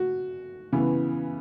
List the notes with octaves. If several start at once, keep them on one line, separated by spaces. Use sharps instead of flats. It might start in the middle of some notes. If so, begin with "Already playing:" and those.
Already playing: F#4
C#3 E3 B3